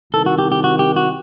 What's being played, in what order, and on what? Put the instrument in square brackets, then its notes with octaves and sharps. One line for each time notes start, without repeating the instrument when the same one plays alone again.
[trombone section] C2 C3 D#3 [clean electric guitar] A4
[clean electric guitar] F#4
G4
G4
F#4
G4
F#4